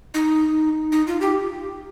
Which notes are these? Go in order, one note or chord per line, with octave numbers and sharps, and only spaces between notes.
D#4
D#4
F4
G4